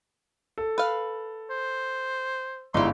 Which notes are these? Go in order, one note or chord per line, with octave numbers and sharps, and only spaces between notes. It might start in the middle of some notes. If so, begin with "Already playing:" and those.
A4
B4 F5
C5
G1 G#2 G3 D#4 E4 C6